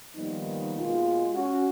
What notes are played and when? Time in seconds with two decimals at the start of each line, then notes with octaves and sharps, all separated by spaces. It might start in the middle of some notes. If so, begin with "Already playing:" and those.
0.16 D#3 F3 G3 A#3 B3 D#4
0.79 B2 G#3 A#3 F4
1.34 C#4 F#4